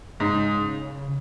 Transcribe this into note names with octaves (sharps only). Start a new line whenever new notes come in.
G#2 C#3